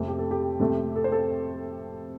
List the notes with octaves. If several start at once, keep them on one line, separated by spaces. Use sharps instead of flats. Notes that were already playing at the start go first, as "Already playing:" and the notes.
Already playing: F2 C3 A3
G4
A4
G4
F2 C3 A3
A4
C5
A4